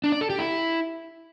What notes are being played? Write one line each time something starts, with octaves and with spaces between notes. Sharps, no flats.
D4
D5
A4
G4
E4